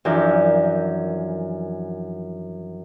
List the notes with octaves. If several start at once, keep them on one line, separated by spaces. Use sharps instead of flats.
F#2 E3 F3 D4 A#4 G6